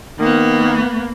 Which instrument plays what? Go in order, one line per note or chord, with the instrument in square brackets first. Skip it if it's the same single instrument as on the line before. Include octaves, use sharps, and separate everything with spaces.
[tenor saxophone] D#3 [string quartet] A#3 B3